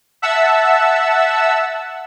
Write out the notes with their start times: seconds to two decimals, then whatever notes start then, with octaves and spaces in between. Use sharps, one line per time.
0.22 E5 F#5 A5 E6